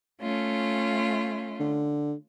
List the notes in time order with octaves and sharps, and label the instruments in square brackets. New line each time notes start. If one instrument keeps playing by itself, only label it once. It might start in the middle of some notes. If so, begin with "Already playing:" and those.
[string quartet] A3 C#4 F4
[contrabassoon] D3